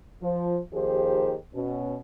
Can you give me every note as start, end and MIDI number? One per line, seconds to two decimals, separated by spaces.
0.22 0.59 53
0.73 1.35 39
0.73 1.35 51
0.73 1.35 53
0.73 1.35 67
0.73 1.35 68
0.73 1.35 72
1.54 1.97 47
1.54 1.97 61